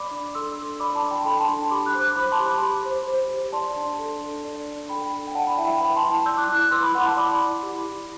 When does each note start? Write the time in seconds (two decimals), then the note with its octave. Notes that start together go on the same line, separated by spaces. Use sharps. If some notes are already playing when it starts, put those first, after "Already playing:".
Already playing: D5 B5 D6
0.11 D4
0.35 A4 C6 E6
0.57 D4
0.80 D5 B5 D6
0.95 A5 C6
1.02 D4
1.11 G5 B5
1.25 A4 G5 B5
1.40 A5 C6
1.48 D4
1.71 G4 B5 D6
1.86 D6 F#6
1.94 C5
2.01 D6 F#6
2.16 C5 B5 D6
2.32 A5 C6
2.39 G4
2.46 B5 D6
2.63 G4
2.85 C5
3.07 C5
3.30 G4
3.52 D5 A5 C6
3.76 D4
3.99 A4
4.21 D4
4.45 D5
4.67 D4
4.89 A4 G5 B5
5.12 D4
5.27 G5
5.34 D5 F#5 A5
5.46 G5 B5
5.57 E4 E5 G5
5.69 G5 B5
5.80 B4 G5 B5
5.96 A5 C6
6.03 E4
6.11 A5 C6
6.26 D5 E6 G6
6.37 D6 F#6
6.48 E4 D6 F#6
6.60 D6 F#6
6.71 B4 C6 E6
6.82 B5 D6
6.94 E4 F#5
7.06 A5 C6
7.16 D5 B5 D6
7.40 E4
7.63 G4
7.85 E4